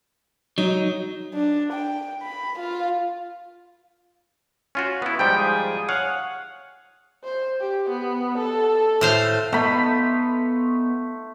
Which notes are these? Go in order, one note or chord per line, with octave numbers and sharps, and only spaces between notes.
F#3 D#4
D4
G5
B5
F4
C#4 F4 F#4
B3 E4
G#2 F3 G3 G5
G#4
C#5 F5 F#5
C5
G4
B3
A4
A2 C5 F5
A3 B3 D#4 F4 B5